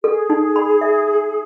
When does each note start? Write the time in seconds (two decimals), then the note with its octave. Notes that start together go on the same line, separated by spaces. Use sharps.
0.04 G#4 A4
0.30 D#4
0.56 B5
0.81 E5